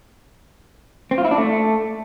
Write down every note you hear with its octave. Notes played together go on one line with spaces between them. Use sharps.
C4
F4
E4
D4
A3